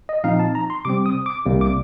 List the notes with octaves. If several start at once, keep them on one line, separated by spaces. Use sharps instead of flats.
D#5
A#2 F3 C4 D#4 F5
A5
A#5
C6
C3 G3 C4 D6
D#6
D6
C2 C3 G3 A#3
D6